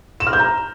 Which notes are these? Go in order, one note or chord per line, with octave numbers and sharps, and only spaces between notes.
E7
F6
G6
A#5